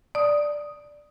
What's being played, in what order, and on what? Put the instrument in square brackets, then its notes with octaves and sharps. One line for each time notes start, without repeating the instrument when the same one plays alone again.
[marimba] D5 D#6